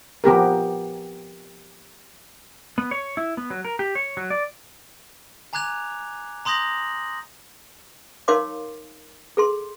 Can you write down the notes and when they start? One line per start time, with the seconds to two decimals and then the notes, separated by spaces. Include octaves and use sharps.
0.24 F3 B3 G4 A#4
2.78 B3
2.91 C#5
3.17 E4
3.37 B3
3.50 F#3
3.65 A#4
3.79 G4
3.95 C#5
4.17 F#3
4.30 D5
5.53 G#5 A#5 D6 F#6 G#6 F7
6.45 A#5 C6 D#6 G6 A#6 F#7
8.28 D#4 A#4 C#5 F5 C6 D6
9.37 G#4 A4 C6